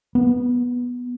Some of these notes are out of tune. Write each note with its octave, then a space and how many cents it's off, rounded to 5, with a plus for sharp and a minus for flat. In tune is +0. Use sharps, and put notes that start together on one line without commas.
B3 -10